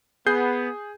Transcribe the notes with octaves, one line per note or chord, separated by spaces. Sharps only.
B3 G#4 G6 C7